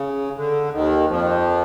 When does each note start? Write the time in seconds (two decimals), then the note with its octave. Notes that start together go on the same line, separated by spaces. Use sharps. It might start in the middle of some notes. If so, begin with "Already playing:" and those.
Already playing: C#3
0.36 D3
0.73 D#2 D#3
1.09 F2 F3